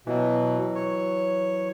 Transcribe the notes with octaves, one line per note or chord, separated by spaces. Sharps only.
B2 E3 F#3
C#5